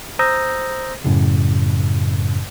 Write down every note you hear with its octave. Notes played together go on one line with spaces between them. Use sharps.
C5 A#5 D#6 E6 G6 A#6
F#2 A2 C#3